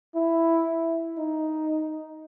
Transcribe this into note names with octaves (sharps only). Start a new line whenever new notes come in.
E4
D#4